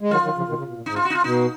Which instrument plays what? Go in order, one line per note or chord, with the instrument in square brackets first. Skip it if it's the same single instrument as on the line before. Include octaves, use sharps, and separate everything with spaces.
[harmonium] G#3
[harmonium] D#3 F#3 [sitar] F4
[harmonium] D#3 F#3
C#3 F3
B2 D#3
C#3
B2
A#2
[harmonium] G#2 [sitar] D#4
[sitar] F4
F#4
D#4
F4
[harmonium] B2 [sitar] D#4